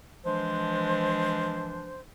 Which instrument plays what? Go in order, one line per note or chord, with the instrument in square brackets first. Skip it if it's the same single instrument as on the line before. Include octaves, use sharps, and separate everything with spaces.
[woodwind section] E3 F3 G#3 D4 C5